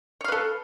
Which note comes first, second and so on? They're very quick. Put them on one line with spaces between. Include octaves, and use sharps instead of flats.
C#5 F5 B4 A4